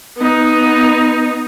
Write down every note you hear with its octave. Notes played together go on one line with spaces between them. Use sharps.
B3 D#4